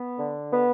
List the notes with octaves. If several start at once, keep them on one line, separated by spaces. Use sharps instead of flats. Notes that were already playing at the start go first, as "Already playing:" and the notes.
Already playing: B3
D3
B3